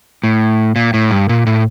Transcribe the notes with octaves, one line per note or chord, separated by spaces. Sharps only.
A2
A#2
A2
G2
A#2
A2